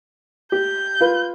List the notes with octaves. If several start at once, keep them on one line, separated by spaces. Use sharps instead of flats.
G4 G6
F4 B4